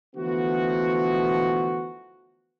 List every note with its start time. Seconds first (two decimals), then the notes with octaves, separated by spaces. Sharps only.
0.15 D3 E3 F3 A3 B3 F#4